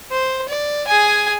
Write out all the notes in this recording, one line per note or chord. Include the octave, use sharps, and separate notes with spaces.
C5
D5
G#4 G#5